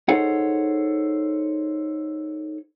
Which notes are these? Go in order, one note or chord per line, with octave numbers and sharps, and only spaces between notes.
D#4 G#4 A4 C5 C#5 F#5